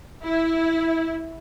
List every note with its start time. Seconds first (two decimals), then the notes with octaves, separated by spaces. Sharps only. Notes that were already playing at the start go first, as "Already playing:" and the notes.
0.24 E4